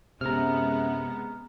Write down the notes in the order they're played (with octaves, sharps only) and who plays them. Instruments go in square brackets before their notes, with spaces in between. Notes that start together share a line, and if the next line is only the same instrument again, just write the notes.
[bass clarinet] F#2 [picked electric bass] C3 [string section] G#3 B3 [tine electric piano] A#5 F6